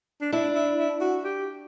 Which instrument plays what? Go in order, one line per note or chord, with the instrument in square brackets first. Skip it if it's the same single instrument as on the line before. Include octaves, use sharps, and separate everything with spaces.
[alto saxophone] D4
[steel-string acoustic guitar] D4 [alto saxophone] E4
[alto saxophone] E4
E4
F#4
G4